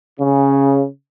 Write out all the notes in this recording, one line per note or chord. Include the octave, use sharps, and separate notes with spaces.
C#3